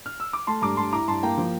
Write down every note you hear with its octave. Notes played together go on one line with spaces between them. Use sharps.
F6
E6
D6
A3 A5 C6
G2 A#5 D6
G2 A5 C6
E4 A#5 D6
G2 A5 C6
A#3 G5 A#5
F3